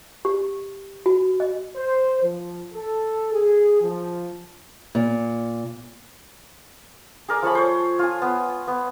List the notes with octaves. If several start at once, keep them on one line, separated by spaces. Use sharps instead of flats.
G4
F#4
D#5
C5
F3
A4
G#4
F3
A#2
G#4 A#4 D5
F3 A4 C#5 B5
C5 C#5
F4 G#5
B3
B3